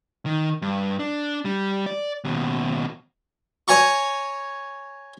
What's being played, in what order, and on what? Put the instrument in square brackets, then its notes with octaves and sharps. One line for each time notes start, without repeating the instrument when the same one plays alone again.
[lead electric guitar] D#3
G2
D4
G3
D5
D#2 B2
[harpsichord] C#5 G#5 A#5 C#6